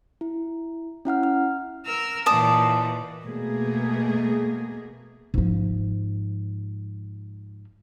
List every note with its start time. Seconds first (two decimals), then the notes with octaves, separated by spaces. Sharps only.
0.21 E4
1.05 C#4 E4 F#5 F6
1.23 F6
1.86 A#4 E6 F6
2.26 D#2 A#2 E3 D5 A5 D#6
3.25 B2 A3 A#3 G#4
5.34 G#2 F3